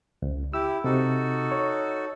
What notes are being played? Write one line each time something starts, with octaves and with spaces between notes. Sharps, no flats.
C#2
E4 G4 E6
C3 D#4 F#4 A4
C#5